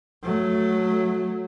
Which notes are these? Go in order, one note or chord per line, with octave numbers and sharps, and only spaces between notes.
F#3 A3